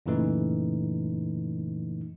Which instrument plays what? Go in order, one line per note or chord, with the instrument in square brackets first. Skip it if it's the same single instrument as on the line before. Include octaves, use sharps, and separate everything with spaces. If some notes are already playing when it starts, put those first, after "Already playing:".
[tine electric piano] F#2 A#2 C#3 E3 A3 D#4